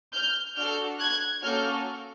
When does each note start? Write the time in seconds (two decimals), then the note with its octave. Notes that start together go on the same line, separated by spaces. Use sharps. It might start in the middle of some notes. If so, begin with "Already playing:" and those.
0.13 F6 G6
0.56 D4 F#4 A4 F6 G6
0.99 F#6 G#6
1.42 A#3 C#4 F#4 A4 F6 G6